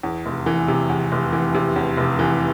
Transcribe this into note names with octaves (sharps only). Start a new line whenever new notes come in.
E2
F1
E3
C3
E2
F1
E3
C3
E2
F1
E3